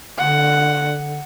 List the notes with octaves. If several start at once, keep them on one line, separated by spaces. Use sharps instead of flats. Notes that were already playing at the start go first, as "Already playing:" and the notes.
D3 F#5